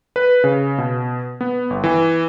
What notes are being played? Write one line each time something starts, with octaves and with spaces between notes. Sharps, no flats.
B4
C#3
B2
B3
G1
E3